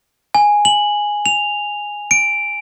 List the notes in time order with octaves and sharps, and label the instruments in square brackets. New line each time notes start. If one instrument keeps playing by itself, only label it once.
[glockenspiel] G#5
F#7
F7
D7